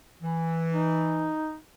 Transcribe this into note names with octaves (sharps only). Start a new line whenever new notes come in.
E3
D#4